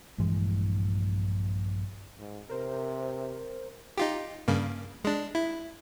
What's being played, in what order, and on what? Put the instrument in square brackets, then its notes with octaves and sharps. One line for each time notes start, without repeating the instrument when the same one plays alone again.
[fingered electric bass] A#1 G2 E3 G#3
[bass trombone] G#2
[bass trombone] C3 [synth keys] A#4 C5
[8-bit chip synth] D#4 F4 G4
G2 C#3 A#3
G#3 D4
E4